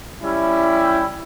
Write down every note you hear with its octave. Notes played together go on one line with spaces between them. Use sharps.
G3 C#4 E4 G4
G5